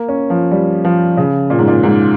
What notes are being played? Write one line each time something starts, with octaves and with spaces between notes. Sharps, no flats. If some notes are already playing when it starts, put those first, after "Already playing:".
Already playing: A#3
C#4
F3
G3
F3
C#3
A#2
G#2
A#2
G#2